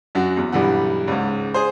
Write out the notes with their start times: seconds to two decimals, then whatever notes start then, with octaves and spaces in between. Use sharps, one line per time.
0.15 F#2 F#4
0.37 E2
0.52 B1 G2 E3 F#5
1.07 C#2 G#2
1.54 G#4 C5